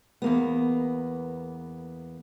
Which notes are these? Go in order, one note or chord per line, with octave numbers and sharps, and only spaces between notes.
E2 A#3 B3